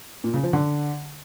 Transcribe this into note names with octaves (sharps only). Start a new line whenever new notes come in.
A#2
C#3
F3
D3